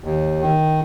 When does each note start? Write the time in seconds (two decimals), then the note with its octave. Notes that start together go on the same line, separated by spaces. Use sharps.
0.04 D#2
0.41 D#3